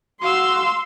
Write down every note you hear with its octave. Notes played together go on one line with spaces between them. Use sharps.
F#4 F5 C6 E6